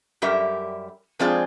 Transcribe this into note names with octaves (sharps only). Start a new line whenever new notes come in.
F#2 G3 G4 A#4 E5
F3 G#3 C4 F4 G#4 D5